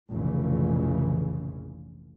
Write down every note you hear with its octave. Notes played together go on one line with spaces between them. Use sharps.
F1 A#1 A#2 C#3 E3